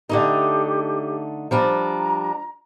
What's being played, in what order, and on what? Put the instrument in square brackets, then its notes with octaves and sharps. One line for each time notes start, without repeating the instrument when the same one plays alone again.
[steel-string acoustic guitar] D3 A3 D#4 [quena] G4
[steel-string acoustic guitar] F3 G3 D4 [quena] A#5